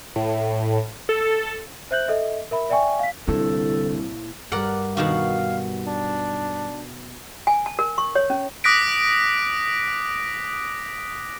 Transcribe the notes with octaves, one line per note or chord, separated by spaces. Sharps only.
A2
A4
C5 E5 F#6 G6 F#7
A4 D#5 E5
A#4 E5 B5
D5 E5 G5 G#5 C#6
F5 B6
C2 A#2 D3 E4 A4 A5
G2 G3 A#4 D5 F#5
B2 D#3 F#4 F5
D4
G#5
A5
A#4
C#6
C#5
C#4
D6 D#6 F#6 A#6 B6 D7